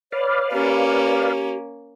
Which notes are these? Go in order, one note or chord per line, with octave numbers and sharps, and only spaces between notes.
B4 C#5 D5 F5
A#3 C#4 G4